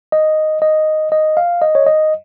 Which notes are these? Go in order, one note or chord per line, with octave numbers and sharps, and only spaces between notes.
D#5
D#5
D#5
F5
D#5
C#5
D#5